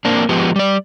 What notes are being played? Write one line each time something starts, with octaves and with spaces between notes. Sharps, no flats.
A#3 C4 D4
F3 G#3 B3 G4
G3 D5